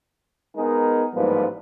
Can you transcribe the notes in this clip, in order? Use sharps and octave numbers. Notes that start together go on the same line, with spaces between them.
G#3 B3 D#4 G#4 A#4
A1 G#2 F3 G3 A#3 B4